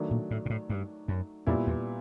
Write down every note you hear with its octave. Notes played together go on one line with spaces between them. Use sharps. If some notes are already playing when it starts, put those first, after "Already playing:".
Already playing: D#3 F#3 A3 D4
A#2
A2
A#2
A2
G2
F#2
F2 A#2 G3 B3 E4
E2